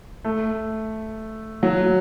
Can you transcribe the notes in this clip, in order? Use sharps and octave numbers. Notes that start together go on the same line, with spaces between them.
A3
F#3